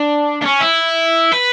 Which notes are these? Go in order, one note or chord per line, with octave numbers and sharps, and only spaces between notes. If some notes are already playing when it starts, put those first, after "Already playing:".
Already playing: D4
D4
C#4
E4
B4